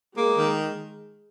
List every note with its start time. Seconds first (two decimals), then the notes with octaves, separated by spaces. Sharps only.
0.16 G#3 A#3
0.37 D#3